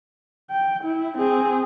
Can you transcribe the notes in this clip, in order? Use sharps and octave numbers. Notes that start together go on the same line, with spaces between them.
G5
E4
C4 G#4